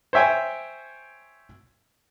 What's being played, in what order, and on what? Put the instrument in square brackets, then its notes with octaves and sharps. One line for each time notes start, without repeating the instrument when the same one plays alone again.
[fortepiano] C5 C#5 E5 G5 G#5